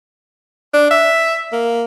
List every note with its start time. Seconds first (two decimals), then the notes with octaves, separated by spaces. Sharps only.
0.73 D4
0.91 E5
1.52 A#3